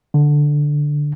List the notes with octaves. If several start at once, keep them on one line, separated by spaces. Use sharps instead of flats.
D3